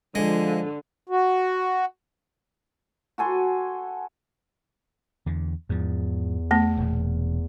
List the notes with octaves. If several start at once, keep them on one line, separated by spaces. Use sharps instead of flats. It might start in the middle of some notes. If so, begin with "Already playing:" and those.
D3 F3 G#3
F#4
F#4 A4 G#5 C6
E2 D3
E2 G#2 F3
A3 B3
E1 A#2